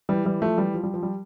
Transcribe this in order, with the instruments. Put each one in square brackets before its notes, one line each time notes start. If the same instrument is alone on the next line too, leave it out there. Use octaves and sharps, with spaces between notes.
[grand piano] E3 G3
E3 G3
F3 A3
E3 G3
F3
G3
F3
G3